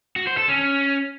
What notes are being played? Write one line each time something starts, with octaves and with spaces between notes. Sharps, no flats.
F#4
C5
A4
C#4